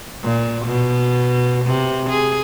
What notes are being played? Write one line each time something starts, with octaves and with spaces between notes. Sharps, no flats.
A#2
B2
C3
G#4